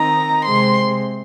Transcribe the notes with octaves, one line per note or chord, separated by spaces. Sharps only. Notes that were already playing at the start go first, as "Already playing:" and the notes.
Already playing: D#3 C4 D#4 A#5
C3 G#3 C4 C6